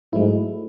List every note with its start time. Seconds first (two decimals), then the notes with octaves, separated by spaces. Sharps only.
0.13 G#2 F#3 A3 E4